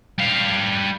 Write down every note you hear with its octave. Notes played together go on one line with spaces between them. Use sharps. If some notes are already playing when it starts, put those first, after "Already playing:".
G3 F5